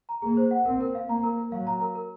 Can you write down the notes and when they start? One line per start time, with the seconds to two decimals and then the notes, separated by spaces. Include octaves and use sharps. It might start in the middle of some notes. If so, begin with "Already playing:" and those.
0.09 A#5
0.22 A#3 G#4
0.37 C5
0.51 F#5
0.65 C4 A#4
0.80 A#4
0.95 F5
1.09 A#3 A#5
1.24 A#4
1.37 A#4
1.52 F#3 F5
1.67 A#5
1.81 A#4
1.95 A#4